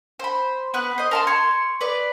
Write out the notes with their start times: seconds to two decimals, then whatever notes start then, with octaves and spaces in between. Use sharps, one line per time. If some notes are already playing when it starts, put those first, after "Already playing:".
0.19 C5 B5
0.74 B3 B4 F#6
0.98 C5 D#5
1.11 A#4 A5 C6
1.27 C#5 C6
1.81 B4 D5